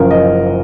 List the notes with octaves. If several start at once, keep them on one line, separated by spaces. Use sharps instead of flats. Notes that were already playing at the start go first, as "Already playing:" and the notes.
Already playing: F#1 F#2 C#3 F3 A#4
D#5